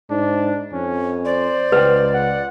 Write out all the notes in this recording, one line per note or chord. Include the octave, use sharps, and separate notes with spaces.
G#2 D4
F2 C#4
C5 D5
C#2 B4 G5
F#5